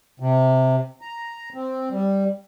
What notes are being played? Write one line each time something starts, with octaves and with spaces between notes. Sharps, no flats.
C3
A#5
C4
G3